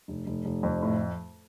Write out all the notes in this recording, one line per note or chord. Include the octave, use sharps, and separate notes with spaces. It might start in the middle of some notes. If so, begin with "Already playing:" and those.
F1
F1
F1
F2
A2